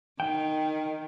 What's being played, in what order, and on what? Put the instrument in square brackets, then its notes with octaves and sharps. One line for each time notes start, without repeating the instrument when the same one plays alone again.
[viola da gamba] D#3 [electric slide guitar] G5